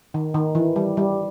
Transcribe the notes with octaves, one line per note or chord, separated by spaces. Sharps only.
D#3
D#3
E3
G3
G3